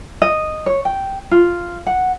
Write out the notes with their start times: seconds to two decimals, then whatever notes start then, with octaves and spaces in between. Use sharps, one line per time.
0.22 D#5
0.66 C#5
0.85 G5
1.31 F4
1.87 F#5